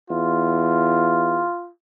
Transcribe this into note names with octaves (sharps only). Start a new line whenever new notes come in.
E2 F4